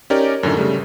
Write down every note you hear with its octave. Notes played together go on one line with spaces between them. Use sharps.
C#4 D#4 G4 A#4 D5
F#2 A2 D3 D#3
C#3 G3 A3